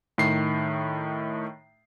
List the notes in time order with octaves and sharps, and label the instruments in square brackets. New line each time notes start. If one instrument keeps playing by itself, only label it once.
[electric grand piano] A2 D#3 C7